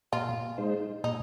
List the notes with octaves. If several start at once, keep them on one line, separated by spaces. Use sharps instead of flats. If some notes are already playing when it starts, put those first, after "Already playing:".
A#2 F4
G#3 D#4 C5
A#2 D#4